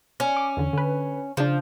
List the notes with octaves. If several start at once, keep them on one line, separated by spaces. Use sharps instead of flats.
C#4
D6
E2 D3
D3 B4
C#3 F3 D4